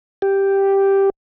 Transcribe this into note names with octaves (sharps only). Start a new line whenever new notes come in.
G4